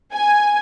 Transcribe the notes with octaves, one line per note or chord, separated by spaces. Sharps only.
G#5